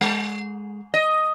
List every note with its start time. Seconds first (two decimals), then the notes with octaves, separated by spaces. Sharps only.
0.01 G#3
0.94 D#5